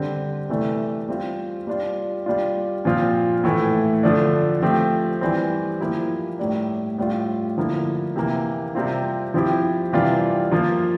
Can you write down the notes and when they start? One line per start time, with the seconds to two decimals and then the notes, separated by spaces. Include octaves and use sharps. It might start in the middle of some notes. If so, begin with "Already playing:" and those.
Already playing: D3 G3 C4
0.49 C3 E3 A3 D4
1.09 G3 C4 F4
1.67 G3 D4 F4
2.26 G3 D4 F4
2.85 A#2 F3 C4 F4
3.44 A2 E3 A3 E4
4.03 D3 F3 A3 D4
4.62 F3 A3 C4 G4
5.21 E3 G3 C4
5.80 F3 A#3 E4 G4
6.39 A2 G3 D4
6.98 A2 G3 D4 F4
7.57 D3 F3 A#3 E4
8.16 C3 E3 A#3
8.75 C3 G3 C4 F4
9.34 F3 C4 E4 G4
9.93 C3 E3 G3 D4 F4
10.51 F3 A#3 F4